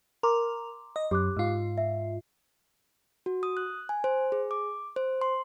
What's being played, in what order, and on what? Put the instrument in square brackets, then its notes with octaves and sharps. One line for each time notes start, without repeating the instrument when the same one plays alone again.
[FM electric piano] A#4 [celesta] A#5 C6 D6
[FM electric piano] D#5
[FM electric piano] F#2 [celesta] G4 D6 F#6
[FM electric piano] G#2 F4
[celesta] E5
[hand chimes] F#4
D#6
F#6
G#5
C5
G#4
D6
C5
C6